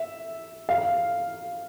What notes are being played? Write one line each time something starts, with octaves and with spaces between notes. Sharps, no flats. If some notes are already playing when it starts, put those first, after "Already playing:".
Already playing: E5
F5